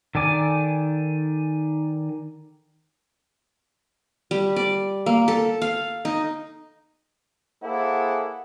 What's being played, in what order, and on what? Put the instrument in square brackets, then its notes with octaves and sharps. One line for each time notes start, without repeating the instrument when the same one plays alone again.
[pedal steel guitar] D#3 A4 D5 G#5 D6
[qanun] G3
D5
A#3
A4
F5
D#4
[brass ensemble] A#3 E4 G#4 A4 C5 F#5